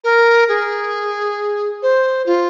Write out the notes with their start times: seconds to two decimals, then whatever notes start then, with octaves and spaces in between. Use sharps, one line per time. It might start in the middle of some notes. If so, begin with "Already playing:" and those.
0.04 A#4
0.48 G#4
1.82 C5
2.26 F4